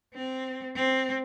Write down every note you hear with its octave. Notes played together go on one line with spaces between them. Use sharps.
C4
C4